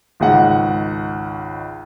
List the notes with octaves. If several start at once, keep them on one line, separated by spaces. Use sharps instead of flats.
G#1 C#2 G#3 F#5